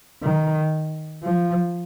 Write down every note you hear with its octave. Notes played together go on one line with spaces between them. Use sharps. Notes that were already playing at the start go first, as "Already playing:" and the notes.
D#3
F3